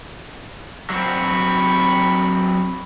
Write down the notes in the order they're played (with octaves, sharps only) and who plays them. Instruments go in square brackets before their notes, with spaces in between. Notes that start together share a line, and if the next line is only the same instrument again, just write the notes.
[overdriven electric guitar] F#3 C4 [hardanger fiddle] B5 C#6